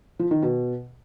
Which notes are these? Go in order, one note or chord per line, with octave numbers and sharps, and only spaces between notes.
F3
D#3
B2